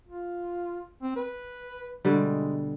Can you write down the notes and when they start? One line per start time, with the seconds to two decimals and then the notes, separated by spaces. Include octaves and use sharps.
0.07 F4
1.03 C4
1.16 B4
2.05 B2 D3 G3 G#3